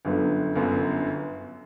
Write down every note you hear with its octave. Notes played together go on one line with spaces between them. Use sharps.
G1 F#2 D3 F#3 B3
G1 F#2 D3 F#3 B3